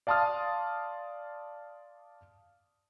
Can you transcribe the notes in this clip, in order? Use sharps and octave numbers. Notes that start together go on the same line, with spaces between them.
D5 F5 A5 C6 D#6 F6